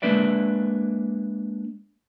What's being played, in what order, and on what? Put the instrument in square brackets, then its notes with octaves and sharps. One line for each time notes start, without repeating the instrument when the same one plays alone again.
[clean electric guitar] G#3 A#3 D4 B4 D5 E5